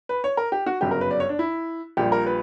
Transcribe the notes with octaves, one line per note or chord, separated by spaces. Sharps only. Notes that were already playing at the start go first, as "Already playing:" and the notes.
B4
C#5
A#4
G4
F#4
G1 F#2 C#3 F#3 G4
A#4
B4
D5
C#5
D4
E4
A#1 A#2 G3 G4
A#4
B4